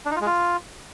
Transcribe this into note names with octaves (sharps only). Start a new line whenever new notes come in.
D4
D#4
F4
G#3
F4